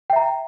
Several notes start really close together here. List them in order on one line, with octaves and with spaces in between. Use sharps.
G5 E5 A#5